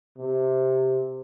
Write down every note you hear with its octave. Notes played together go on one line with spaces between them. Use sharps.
C3